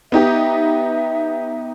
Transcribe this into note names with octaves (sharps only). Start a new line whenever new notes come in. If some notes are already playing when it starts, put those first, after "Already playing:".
B3 D#4 G4 E5